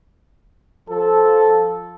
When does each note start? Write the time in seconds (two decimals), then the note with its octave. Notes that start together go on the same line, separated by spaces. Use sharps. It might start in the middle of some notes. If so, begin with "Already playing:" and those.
0.89 F3 A4